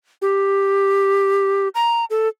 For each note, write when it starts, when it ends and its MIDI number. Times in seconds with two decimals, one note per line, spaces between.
0.22 1.68 67
1.75 2.05 82
2.10 2.28 69